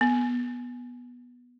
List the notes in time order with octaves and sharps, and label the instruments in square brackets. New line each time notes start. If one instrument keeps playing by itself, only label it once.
[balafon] B3